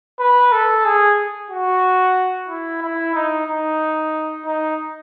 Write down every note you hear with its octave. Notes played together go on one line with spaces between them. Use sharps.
B4
A4
G#4
F#4
E4
E4
D#4
D#4
D#4